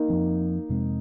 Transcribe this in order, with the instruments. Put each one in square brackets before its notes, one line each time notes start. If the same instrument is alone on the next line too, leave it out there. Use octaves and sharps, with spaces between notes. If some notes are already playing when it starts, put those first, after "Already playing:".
Already playing: [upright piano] A#3 D#4
[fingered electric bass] F2 F3 C4
F2 C3 G#3 C4